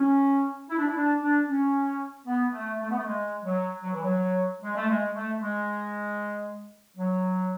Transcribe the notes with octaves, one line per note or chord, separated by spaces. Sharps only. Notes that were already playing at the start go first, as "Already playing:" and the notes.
Already playing: C#4
E4
D4
E4
D4
D4
C#4
B3
A3
A3
B3
A3
G#3
F#3
F#3
E3
F#3
G#3
A3
G#3
A3
G#3
F#3